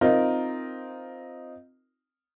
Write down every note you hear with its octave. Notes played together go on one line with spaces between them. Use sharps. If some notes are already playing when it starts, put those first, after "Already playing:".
C4 D#4 F4 A#4